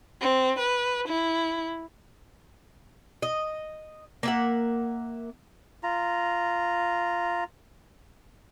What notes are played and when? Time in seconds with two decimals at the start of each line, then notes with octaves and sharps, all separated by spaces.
0.21 C4
0.59 B4
1.08 E4
3.22 D#5
4.23 A#3 E5 F#5
5.83 F4 A#5